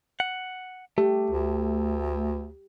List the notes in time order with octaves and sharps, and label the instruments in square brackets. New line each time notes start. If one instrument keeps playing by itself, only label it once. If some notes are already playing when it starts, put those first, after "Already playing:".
[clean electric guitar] F#5
[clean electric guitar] A3 [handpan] G4
[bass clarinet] D2